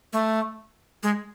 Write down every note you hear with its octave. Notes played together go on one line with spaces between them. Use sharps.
A3
G#3